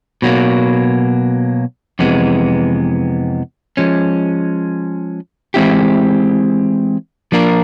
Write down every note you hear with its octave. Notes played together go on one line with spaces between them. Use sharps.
B2 F#3 A#3
F2 C3 E3 G#3 B3
F3 G#3 C#4
E3 G#3 C4 E4 G4
F3 A#3 D4 F4 A#4